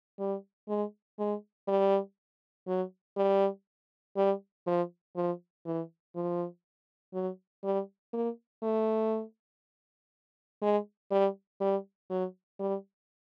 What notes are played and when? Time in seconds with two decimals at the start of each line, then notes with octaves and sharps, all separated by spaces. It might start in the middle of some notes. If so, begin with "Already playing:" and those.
0.19 G3
0.68 G#3
1.19 G#3
1.68 G3
2.67 F#3
3.17 G3
4.17 G3
4.67 F3
5.16 F3
5.65 E3
6.15 F3
7.14 F#3
7.64 G3
8.13 A#3
8.63 A3
10.62 G#3
11.11 G3
11.61 G3
12.10 F#3
12.60 G3